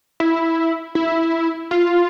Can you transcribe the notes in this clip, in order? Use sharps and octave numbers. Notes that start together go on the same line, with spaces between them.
E4
E4
F4